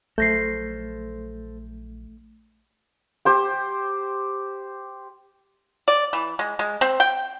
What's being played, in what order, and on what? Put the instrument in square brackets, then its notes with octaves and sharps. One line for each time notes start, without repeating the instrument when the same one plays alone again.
[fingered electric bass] A#1 F#3 [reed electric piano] A3 [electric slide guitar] A4 C5 [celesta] G6 A#6 C7
[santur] G4 C5 G5
[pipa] D5
E3
G#3
G#3
C4
G5